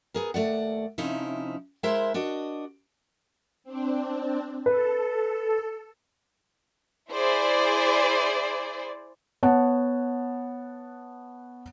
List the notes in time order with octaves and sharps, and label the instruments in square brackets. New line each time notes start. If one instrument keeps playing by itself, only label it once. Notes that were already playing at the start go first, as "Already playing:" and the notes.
[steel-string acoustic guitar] B3 G#4 A#4
D#2 A3 D5 F#5
C3 F3 C#4 D#4 E4
G#3 E4 A#4 C5 E5
D4 F#4 D#5
[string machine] C4 D4
[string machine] A4 [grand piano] B4
[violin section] E4 G#4 C5 D5
[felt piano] B3 C#5 F#5 A5